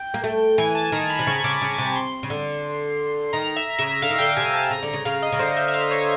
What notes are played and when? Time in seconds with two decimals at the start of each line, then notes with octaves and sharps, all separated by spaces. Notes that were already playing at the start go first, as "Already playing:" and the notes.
Already playing: G5
0.14 A#3
0.24 A3
0.58 E3 G#5
0.75 A5
0.92 D#3 A#5
1.10 B5
1.19 C3
1.27 C#3 C#6
1.44 C#3 D6
1.62 C#3 D6
1.78 C3 C#6
1.96 C6
2.23 C#3
2.30 D3
3.33 D#3 A#5
3.56 E5
3.79 C#3 E5
4.02 D3 F5
4.10 D#3
4.19 D3 G5
4.37 C3 G#5
4.54 A5
4.71 C#3 A#5
4.83 D3
4.88 A#5
4.93 C#3
5.05 C#3 F5
5.23 D#5
5.32 C#3
5.39 D3 C5
5.56 E5
5.68 E5
5.74 F5
5.91 C#5